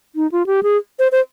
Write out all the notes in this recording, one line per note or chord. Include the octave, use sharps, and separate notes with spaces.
D#4
F4
G4
G#4
C5
C5